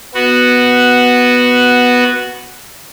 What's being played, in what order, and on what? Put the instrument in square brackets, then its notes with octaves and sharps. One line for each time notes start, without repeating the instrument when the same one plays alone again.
[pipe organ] B3 F#4